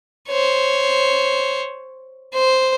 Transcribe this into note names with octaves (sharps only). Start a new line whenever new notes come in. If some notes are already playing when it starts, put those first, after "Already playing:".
C5 C#5
C5